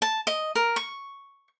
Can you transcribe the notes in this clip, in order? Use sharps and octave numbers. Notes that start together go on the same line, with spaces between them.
A5
D#5
A#4
C#6